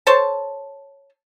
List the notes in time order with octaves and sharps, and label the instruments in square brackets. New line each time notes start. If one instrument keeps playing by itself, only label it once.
[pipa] A4 C5 C#5 A5